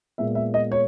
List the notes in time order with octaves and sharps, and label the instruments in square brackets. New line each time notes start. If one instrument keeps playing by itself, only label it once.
[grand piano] A#2 G#3 B3 E5
E5
D#5
C#5